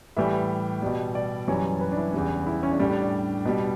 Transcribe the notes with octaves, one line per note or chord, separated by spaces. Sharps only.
A2 E3 G3 E5
B2 G3
D5
F#2 E3 G3 C#5
B4
D4
E4
E2 C#3 E3 G3
E4
C#4
D4
A2 G3 C#4
D4
D4
B2 G3